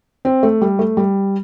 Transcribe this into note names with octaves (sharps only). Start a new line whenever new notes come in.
C4
A3
G3
A3
G3